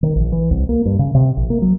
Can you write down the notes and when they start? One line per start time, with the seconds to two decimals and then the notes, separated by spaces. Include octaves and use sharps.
0.03 D#3
0.16 A#1
0.32 E3
0.51 C2
0.69 A#3
0.86 G2
0.99 C#3
1.15 C3
1.37 A#1
1.50 A#3
1.62 F#3